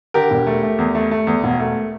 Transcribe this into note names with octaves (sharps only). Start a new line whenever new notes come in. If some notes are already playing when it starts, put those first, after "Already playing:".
D3 G4 A#4
E1
A3
A3
E2
A3
A3
E2
E1
A3